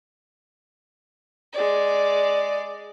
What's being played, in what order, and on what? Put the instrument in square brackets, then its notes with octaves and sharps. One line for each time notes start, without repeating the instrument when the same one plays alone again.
[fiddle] G#3 D5